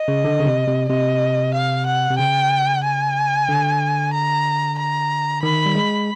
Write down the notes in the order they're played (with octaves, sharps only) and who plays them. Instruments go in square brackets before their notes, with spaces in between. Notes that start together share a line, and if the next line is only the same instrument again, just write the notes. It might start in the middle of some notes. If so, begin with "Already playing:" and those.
Already playing: [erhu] D#5
[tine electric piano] C#3
D3
C#3
C3
C3
[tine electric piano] C3 [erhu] D#5
[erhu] F5
F#5
[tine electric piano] C3
[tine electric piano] C#3 [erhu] G5
[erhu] G#5
[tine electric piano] D3
[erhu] A#5
A#5
[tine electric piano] D#3 [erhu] B5
[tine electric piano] G3
G#3